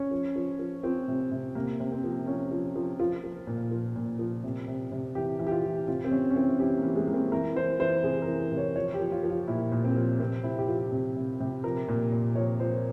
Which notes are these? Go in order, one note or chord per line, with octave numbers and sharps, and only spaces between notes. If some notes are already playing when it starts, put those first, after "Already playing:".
Already playing: C#4
F3
F3
F3
F3 C4
C3
C3
C3 A#3
C3
C4
F3
F3 C#4
F3
F3
F3 F4
F3
A#2
F3
A#2
F3
C3
C3
C3
E3 G4
E3
G4
F4
E3
C3 F4
C4
C3 C#4
C#4
E3 C4
E3 G4
A#3
E3
G#3
E3 A#3
C4
E3 A#4
E3 C5
E3 C5
C3 G#4
A#4
E3
A#4
C3
C#5
F3 C#5
G4
F3
F4
F3
F4
A#2 E4
A#2
C4
F3
C3 C4
C3 E4
G4
F3 F4
C3 G4
C3
C3
F3 A#4
A#2
A#2
F3 C#5
F3 C5